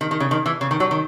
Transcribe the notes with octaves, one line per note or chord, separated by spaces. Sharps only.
D#3
D#3
C#3
D#3
E3
C#3
D#3
F#3
D#3